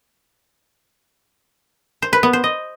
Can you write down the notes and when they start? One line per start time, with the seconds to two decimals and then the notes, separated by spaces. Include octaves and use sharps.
2.02 C5
2.13 B4
2.23 B3
2.33 C5
2.44 D#5